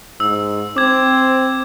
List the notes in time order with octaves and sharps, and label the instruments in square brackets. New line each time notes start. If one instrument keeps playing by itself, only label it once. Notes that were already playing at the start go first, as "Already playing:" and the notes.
[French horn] G#2 [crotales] E6
[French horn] C4 [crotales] D6 G#6